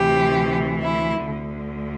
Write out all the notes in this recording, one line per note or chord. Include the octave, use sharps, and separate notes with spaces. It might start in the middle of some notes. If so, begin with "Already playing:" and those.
Already playing: D2 C3 E3 G4
E4
D2 D3